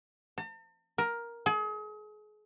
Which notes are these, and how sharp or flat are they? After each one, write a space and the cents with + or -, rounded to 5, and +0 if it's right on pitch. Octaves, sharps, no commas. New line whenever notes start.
A5 +45
A#4 +10
G#4 +35